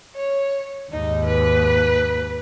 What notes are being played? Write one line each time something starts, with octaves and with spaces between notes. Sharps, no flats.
C#5
D#2 G#2 D#4
B4